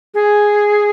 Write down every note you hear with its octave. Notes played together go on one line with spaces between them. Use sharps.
G#4